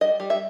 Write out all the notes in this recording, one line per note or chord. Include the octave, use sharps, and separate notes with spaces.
G3 D#5
G3
E5